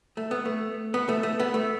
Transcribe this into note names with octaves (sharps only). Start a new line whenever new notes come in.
A3
B3
A3
B3
A3
A3
B3
A3